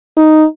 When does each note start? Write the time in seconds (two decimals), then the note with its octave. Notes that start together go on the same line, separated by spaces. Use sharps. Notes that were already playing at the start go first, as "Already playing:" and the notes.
0.17 D#4